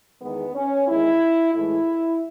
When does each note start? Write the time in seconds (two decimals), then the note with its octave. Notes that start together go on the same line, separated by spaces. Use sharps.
0.22 E2 D#3 G#3 B3
0.55 C#4
0.88 E2 D#3 G#3 E4
1.54 A2 E3 G#3 E4